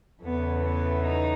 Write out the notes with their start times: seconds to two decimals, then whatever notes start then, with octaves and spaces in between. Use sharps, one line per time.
0.23 E2 C#3 E3 A3 B3
0.65 B3
1.06 D#4